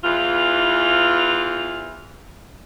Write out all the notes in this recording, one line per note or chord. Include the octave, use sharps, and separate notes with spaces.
E2 E3 F4